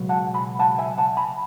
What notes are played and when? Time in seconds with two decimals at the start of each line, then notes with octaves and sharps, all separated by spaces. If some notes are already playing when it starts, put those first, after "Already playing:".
Already playing: C#2 B2 F#3
0.09 F#5 A5
0.34 G#5 B5
0.59 F#5 A5
0.78 E5 G#5
0.98 F#5 A5
1.17 G#5 B5